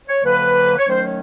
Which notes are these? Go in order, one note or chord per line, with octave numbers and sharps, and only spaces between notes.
C#5
F2 D3 F#3 A#3 B4
C#5
D#3 F#3 A3 C#4 C5
C#5